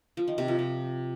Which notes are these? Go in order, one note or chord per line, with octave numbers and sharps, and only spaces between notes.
F3
D#3
C3
F3
C3